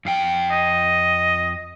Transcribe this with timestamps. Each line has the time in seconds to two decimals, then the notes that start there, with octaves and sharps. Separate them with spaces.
0.05 F2 F5 G5
0.51 D#5